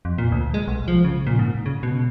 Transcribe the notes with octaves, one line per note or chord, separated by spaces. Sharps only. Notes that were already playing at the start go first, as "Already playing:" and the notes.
F2
A#2
D2
G#3
B1
F3
C#3
A#2
G#2
C#3
B2